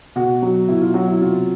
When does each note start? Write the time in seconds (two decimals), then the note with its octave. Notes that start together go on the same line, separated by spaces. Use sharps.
0.16 B2 F#4
0.42 F#3
0.69 B2 E4
0.81 F4
0.94 F#3 F#4
1.08 E4
1.21 C3 F4